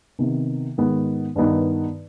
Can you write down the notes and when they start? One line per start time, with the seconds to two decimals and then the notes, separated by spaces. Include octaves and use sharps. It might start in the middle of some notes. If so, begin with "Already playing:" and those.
0.19 C3 D#3 B3
0.78 G#2 D#3 G#3 B3
1.36 G2 D#3 B3 D#4